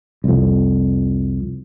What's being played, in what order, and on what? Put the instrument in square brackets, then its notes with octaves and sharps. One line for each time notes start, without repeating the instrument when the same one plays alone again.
[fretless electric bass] C2 F2